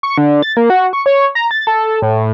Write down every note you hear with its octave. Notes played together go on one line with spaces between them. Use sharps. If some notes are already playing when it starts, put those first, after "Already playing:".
C#6
D3
A6
A#3
F#4
C#6
C#5
A#5
A6
A4
A4
A2